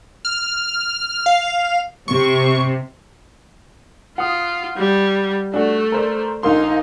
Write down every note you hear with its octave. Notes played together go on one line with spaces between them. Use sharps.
F6
F5
C3 C#6
F4 F#5 D#6
G3
A3 D4 F#4
A#4 C5 D5
A#1 A#3 D#4 C6